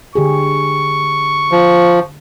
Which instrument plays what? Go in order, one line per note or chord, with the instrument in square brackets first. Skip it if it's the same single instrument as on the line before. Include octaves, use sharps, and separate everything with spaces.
[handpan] D3 G4 G#4 [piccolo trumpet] C#6
[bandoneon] F3